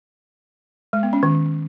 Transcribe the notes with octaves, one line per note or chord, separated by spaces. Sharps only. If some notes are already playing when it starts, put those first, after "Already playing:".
G#3
B3
C#4
D#3